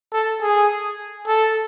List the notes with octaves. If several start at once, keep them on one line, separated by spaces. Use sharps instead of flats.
A4
G#4
A4